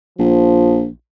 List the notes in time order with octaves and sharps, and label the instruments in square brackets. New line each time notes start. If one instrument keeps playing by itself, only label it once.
[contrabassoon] A#1 [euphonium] F3